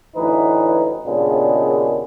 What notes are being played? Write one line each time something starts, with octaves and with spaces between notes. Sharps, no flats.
A1 D2 E3 D#4 B4
D#2 A#2 C#3 G#3 B3 D4